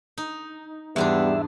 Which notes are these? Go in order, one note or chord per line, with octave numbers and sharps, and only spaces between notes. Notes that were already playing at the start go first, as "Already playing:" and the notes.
D#4
E2 G#2 G3 B3 D4 E5